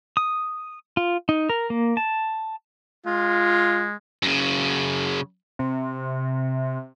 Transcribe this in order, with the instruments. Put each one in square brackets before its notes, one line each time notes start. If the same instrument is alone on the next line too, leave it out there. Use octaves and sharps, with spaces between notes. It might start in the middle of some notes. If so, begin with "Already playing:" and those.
[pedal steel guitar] D#6
F4
D#4
A#4
A#3
A5
[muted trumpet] G#3 [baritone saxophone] F4
[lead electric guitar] F#2 C#3
[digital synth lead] C3